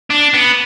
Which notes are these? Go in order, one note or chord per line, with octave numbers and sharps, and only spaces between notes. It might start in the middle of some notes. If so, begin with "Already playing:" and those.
D4
B3